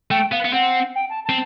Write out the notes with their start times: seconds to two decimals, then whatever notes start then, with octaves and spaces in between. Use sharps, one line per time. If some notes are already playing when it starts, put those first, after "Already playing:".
0.11 A3 G5
0.32 B3 F5
0.45 B3
0.53 C4 F#5
0.95 G5
1.10 A5
1.24 A5
1.29 C4